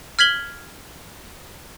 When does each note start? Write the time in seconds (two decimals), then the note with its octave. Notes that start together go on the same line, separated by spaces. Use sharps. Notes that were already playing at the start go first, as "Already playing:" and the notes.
0.19 F6 G#6 B6 F#7 G7